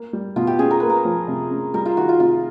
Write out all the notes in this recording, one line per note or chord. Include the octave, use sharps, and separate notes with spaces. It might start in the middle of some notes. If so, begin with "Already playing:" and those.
Already playing: A#3
G3
B2 F4
G4
C#4 G#4
A#4
A#3 B4
A#4
F3
C3
C#4
G3 A#4
F4
D#3 F#4
F4
C3 F4